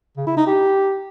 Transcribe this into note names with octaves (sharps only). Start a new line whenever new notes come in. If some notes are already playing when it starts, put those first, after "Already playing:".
C#3
E4
D#4
G4